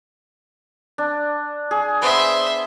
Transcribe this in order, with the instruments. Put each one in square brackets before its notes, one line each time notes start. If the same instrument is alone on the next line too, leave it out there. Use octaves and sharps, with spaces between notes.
[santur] D4
G#4
[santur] B3 [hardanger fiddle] C5 E5